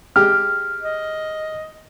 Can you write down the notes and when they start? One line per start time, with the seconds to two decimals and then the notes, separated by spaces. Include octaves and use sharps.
0.16 G#3 G4 F6
0.82 D#5